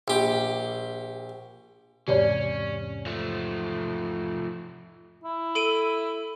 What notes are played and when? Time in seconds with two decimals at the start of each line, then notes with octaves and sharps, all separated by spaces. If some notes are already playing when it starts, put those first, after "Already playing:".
0.08 A#1 G4
2.08 E2 G#2 C3 C#4 G4 C#5 D5
3.06 F3 A3
5.24 E4
5.55 A4 D7 D#7